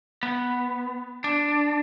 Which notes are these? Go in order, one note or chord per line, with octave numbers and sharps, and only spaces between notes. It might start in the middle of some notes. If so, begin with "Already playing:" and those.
B3
D4